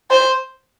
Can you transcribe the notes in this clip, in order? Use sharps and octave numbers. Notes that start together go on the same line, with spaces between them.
C5